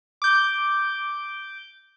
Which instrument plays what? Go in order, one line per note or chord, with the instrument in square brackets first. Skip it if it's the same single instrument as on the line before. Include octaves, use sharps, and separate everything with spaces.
[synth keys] D6 G6